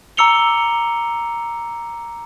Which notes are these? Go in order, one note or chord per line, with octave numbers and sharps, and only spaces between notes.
A#5 D6 E6 C#7 F7 G7